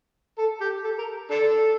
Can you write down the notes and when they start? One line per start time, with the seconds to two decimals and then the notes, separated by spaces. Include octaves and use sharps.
0.38 A4
0.61 G4
0.84 A4
0.98 A#4
1.30 D4 A4